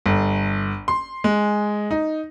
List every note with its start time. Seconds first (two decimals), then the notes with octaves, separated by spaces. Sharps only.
0.06 G1
0.88 C6
1.24 G#3
1.91 D#4